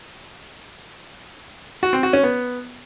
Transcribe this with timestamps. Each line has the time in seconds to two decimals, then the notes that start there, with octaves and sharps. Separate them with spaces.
1.83 F#4
1.93 C4
2.03 F#4
2.13 C#4
2.23 B3